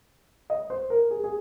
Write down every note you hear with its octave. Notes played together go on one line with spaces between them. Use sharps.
D#5
C5
A#4
G#4
G#4